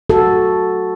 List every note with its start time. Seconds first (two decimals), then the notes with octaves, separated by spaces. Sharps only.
0.10 F#4 A4